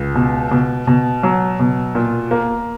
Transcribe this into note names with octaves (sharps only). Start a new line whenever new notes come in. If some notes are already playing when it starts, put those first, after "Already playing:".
Already playing: C#2
B2
B2
B2
F#3
B2
A#2
A#3